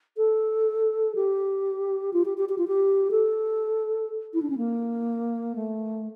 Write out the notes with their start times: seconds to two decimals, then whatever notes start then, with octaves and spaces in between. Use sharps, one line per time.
0.17 A4
1.15 G4
2.13 F4
2.25 G4
2.37 G4
2.49 G4
2.58 F4
2.67 G4
3.11 A4
4.33 E4
4.42 D4
4.50 C#4
4.57 A#3
5.56 A3